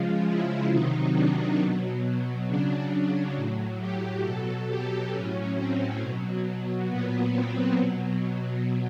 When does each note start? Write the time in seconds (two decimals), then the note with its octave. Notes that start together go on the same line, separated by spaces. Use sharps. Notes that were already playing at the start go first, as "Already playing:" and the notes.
Already playing: C#3 F3 G#3 F4
0.28 E4
0.72 C3 D#3 F#3 D#4
1.16 D4
1.60 B2 F#3
2.48 C#3 F#3 D4
2.92 D4
3.36 A2 F#3
3.80 G4
4.24 B2 F#3 A4
4.68 G4
5.11 A2 F#3 C#4
5.56 C4
6.00 B2 F#3
6.88 A#2 F#3 B3
7.32 C4
7.76 B2 F#3